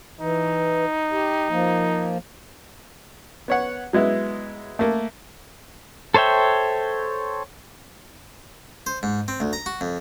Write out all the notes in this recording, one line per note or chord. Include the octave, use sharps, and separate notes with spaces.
E3 D#4
G4
F3 A#3
B3 C#5 F#5
F#3 G#3 B3 E4
A3 A#3
A4 C5 C#5 E5 G5
C5
G#2
C4
D2
A#5
F#4
F2